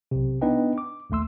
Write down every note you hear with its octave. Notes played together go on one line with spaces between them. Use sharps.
B1 C3
B3 D4 D#4 B4 D#5 G5
D6
A#1 D#2 A3 C6 E6